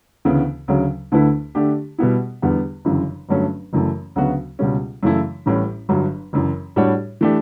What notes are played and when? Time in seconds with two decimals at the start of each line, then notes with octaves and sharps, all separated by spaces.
0.25 D2 C#3 E3 B3
0.68 D2 C#3 F#3
1.12 D2 D3 A3 E4 B4
1.55 D3 A3 D4 G4
1.98 B2 G3 B3 E4
2.42 E2 D3 G3 B3
2.85 G1 F#2 C#3 E3
3.29 G1 G2 F#3 A3 C#4
3.73 F#1 F#2 E3 A3
4.16 D2 C#3 F#3 B3 F#4
4.59 C#2 B2 G3 C#4
5.03 F#2 C#3 E3 A3 E4
5.46 A1 A2 G3 C#4
5.89 G1 G2 F#3
6.33 F#1 F#2 E3
6.76 A2 G3 D4 F#4 C#5
7.21 E3 A3 D4 G4